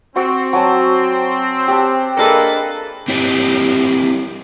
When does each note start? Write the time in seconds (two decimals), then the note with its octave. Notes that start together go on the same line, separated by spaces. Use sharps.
0.16 C4 F#4 C#6
0.53 F#3 G#5 A5
1.68 G4 F#5 A5
2.17 A#3 D4 G#4 A4 B4 D#5
3.08 C4 E4 G4 C#5